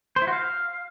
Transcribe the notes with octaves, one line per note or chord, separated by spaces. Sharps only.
C5
E4
F#4
F5